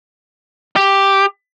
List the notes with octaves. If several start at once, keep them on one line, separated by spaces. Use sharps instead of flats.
G4